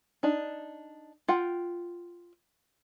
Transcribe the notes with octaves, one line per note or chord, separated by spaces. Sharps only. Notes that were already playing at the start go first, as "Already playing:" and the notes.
D4 D#4
F4 F#5 G5